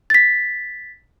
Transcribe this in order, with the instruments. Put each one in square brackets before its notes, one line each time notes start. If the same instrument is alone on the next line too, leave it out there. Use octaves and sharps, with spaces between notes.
[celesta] A6 B6